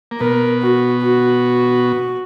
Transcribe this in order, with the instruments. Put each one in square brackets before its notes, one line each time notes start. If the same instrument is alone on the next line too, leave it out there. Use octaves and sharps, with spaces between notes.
[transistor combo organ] A#3
[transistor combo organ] B2 B3 [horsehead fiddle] A#4
[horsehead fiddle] F#4
F#4